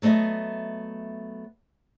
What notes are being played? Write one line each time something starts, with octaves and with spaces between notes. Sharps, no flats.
F#3 A3 B3 D#5 E5